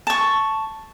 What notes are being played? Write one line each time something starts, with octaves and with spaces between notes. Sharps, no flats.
A5 C#6